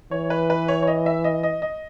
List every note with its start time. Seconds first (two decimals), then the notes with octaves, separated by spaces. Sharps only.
0.11 E3 C#5
0.30 B4
0.50 B4
0.68 C#5
0.82 C#5
0.87 D#5
1.06 E5
1.24 D#5
1.43 D#5
1.62 D#5